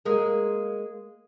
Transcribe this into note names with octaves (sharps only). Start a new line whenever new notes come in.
G#3 A#3